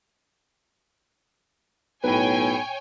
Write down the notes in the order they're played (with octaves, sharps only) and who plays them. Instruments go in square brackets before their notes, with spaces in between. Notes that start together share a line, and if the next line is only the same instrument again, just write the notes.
[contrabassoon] B1 [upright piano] A2 B4 [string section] C#5 G5 G#5